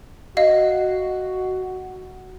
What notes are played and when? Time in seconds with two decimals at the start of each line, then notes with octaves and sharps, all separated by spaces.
0.37 F#4 D#5 F5